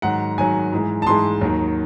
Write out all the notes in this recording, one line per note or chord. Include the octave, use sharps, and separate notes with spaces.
G#2 D#3 F#3 F#5
G#2 D#3 F#3 G#5
G#2 E3 G#3
A5
G#2 E3 G#3 C6
D#2 D#3 F#3